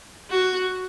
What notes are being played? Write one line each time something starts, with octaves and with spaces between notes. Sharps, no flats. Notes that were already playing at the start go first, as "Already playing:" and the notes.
F#4